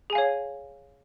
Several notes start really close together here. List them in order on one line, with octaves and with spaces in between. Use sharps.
G#4 G#5 F5 C#5